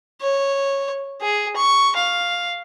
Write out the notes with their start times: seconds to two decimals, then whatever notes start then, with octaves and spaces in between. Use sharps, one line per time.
0.22 C#5
1.22 G#4
1.56 C#6
1.96 F5